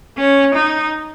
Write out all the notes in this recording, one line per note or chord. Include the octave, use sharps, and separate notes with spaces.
C#4
D#4